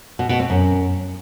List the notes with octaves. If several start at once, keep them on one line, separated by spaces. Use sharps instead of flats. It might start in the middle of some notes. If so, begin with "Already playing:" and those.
B2
B2
C4
F#2